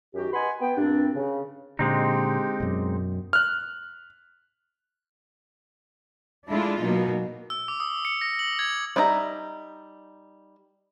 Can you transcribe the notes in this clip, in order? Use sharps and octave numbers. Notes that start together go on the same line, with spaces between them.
F#2 D#3 F#4 G4
B4 D#5 F#5 G#5 B5 C6
B3 G5
G2 A#2 C4 D4
C#3
A#2 D3 G#3 C4 D#4 G4
F#2 B2
F6 F#6
G#3 A3 D4 E4 F4
B2 F#3 A#3 D#4
E6
D6
D#6
C#7
A#6
F#7
G#6
G3 D4 D#4 E5 A#5